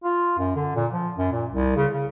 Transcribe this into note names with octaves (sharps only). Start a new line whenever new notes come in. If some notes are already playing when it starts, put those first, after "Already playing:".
F4
F#2
D3
A#2
F3
F#2
A#2
C2
C#3
C#3